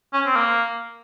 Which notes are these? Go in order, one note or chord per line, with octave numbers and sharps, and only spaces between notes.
C#4
C4
A#3